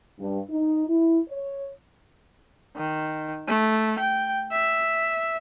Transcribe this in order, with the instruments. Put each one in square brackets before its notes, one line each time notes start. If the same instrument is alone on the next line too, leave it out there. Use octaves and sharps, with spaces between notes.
[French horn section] G2
D#4
E4
C#5
[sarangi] D#3
A3
G5
E5